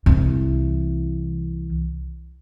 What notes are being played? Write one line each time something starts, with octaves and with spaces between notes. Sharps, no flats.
C2 E3